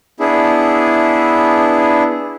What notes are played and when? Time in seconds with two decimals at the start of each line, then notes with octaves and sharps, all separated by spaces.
0.20 B3 D4 E4 G#4